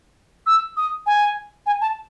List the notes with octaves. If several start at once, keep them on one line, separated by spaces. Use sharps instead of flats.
E6
D#6
G#5
G#5
A5